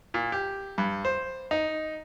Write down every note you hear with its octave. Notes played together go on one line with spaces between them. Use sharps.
A#2
G4
G2
C5
D#4